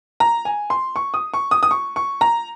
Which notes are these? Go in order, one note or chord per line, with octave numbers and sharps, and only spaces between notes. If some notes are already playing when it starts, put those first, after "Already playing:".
A#5
G#5
C6
C#6
D#6
C#6
D#6
D#6
C#6
C#6
A#5